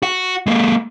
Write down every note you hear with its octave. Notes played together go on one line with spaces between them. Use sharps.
F#4 F#5
G#3 A#3